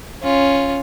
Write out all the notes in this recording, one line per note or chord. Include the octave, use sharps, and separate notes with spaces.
C#4 F4